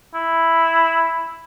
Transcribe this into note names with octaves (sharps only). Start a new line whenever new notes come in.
E4